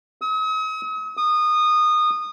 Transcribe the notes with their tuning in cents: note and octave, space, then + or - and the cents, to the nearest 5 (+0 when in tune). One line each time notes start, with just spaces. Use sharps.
D#6 +45
D#6 -20